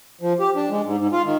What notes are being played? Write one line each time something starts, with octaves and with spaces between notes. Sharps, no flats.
F3
G4
D4
G#3
G#2
G#2
F4
D#3